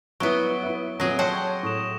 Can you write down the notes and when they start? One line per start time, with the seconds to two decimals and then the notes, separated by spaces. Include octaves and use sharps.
0.20 F#3 G3 B3 E4 C#6 D7 G7
0.63 E4 E5
1.00 F2 A#2 F#3 G#4 A#6
1.19 C5 C#5 F#5 G5 A5
1.63 A2 C#6 D#6 E7